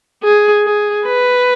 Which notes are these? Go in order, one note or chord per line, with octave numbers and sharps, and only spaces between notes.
G#4
G#4
B4